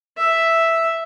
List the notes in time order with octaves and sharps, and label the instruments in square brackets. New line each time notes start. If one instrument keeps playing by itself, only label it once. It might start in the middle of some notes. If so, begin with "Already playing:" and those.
[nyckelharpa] E5